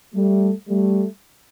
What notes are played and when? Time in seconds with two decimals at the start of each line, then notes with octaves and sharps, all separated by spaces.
0.15 G3 A3
0.68 G3 A3